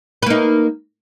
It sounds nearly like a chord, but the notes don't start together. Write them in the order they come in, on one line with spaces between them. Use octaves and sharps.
B4 A#3 D#4